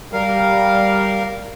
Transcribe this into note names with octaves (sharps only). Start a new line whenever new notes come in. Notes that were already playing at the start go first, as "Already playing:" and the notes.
G3 A#4 F5